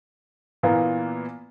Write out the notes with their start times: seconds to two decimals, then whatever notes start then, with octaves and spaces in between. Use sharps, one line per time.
0.63 A#2 E3 A#3 B3